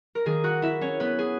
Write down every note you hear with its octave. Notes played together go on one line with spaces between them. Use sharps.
A#4
D#3 A#3 G#4
F#4 F#5
E4 E5
C#4 C#5
B3 B4
G#4